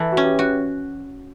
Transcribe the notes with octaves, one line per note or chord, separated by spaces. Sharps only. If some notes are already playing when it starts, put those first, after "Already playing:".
Already playing: E3 A4
F#4
C#4
G4
F#4